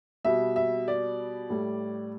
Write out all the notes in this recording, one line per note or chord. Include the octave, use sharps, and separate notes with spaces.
B2 G3 E5
E5
D5
A2 G3